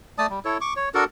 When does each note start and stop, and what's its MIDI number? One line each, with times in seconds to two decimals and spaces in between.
0.18 0.27 57
0.18 0.27 74
0.18 0.27 81
0.18 0.27 87
0.30 0.39 55
0.45 0.58 64
0.45 0.58 69
0.45 0.58 73
0.61 0.74 85
0.61 0.74 86
0.76 0.89 73
0.94 1.04 62
0.94 1.04 66
0.94 1.04 69
0.94 1.04 70